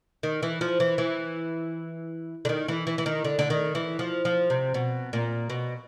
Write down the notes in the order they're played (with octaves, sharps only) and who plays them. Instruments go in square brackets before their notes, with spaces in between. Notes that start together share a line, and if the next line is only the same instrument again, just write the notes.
[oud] D#3
E3
F3
E3
E3
D3
D#3
E3
E3
E3
D#3
D3
D3
D#3
E3
F3
F3
C3
B2
A#2
B2